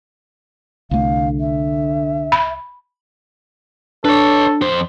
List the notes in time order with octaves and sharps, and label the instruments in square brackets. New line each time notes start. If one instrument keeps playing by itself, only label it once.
[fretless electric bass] C2 A3 [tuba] D3 [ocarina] F5
[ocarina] E5
[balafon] B5
[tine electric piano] D4 [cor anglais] A4 [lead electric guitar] B4 C#5
[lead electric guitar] F2 C5